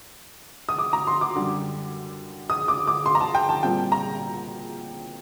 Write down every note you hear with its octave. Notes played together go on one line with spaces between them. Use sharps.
D#6
D6
A#5
C6
D6
F#2 D3 G3
D#6
D6
D6
C6
A#5
A5
G5
A5
A#2 G3 C4 G5
A#5